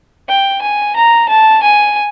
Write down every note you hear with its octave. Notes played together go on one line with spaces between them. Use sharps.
G5
G#5
A#5
A5
G#5